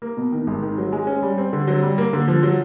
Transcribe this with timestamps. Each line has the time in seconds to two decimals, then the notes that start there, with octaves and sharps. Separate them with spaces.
0.02 A#3
0.17 B2
0.32 D#3
0.47 G#1
0.62 D#3
0.78 F#3
0.92 G#3
1.07 C#4
1.22 G3
1.38 C4
1.53 D3
1.67 F#3
1.83 G3
1.98 A#3
2.13 D3
2.28 F3
2.43 F#3